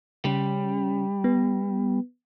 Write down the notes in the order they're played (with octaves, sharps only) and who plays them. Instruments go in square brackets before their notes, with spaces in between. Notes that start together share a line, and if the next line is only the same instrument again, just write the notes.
[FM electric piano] C#3 C#4 [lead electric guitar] G3
[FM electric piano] B3